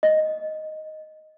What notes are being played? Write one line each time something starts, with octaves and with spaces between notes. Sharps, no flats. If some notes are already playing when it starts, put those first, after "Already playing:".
D#5